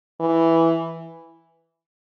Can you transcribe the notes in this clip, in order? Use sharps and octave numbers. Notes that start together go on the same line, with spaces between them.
E3